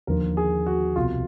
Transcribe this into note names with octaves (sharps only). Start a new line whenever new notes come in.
D#2 D3 F3 A#4
G#4
F#4
C2 B2 F4